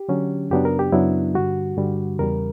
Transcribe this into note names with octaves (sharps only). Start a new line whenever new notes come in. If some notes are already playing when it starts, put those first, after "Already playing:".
Already playing: G4
D3 F#3 C#4
F#2 C#3 F#3 B3 D4 G4
A#4
G4
F#2 C#3 F#3 B3 D4 E4
G2 D3 G3 F#4
G2 D3 G3
E2 C#3 G3 A#4